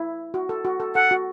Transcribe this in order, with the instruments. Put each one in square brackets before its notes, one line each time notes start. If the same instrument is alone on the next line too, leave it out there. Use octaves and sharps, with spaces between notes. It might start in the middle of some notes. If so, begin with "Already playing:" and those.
Already playing: [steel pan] E4
F#4
A4
F#4
A4
[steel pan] A4 [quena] F#5
[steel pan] F#4